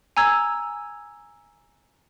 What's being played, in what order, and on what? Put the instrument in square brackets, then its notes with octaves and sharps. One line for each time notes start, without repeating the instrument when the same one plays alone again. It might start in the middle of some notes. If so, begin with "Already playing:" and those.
[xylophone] G#5 A#5 E6 G#6